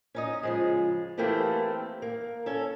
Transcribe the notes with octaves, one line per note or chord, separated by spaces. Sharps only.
C#4 D#4 D#5
C#3 F3 G#3
E3 A3 A#3 C4 G4 A4
A#3
C#4 A4